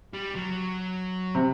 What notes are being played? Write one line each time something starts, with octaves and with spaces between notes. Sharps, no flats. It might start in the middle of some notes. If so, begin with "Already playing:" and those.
G3
F#3
C3